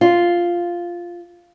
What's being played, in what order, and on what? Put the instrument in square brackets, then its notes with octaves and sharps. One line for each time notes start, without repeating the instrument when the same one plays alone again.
[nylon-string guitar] F4